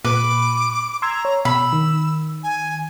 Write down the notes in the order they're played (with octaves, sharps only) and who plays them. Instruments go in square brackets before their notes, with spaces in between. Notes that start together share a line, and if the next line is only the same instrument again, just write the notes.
[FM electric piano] A#2 [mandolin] B4 [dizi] D6
[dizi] A#5 [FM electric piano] C6 E6 G#6
[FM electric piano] C#5
[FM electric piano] B2 [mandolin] B5 [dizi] E6
[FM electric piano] D#3
[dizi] G#5